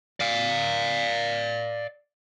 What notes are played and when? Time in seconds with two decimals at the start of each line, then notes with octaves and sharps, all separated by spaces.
0.20 D5 F5